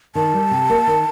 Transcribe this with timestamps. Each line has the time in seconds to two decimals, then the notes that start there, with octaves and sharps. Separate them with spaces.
0.15 D#3 A5
0.34 G3
0.51 C3
0.70 A#3
0.87 D#3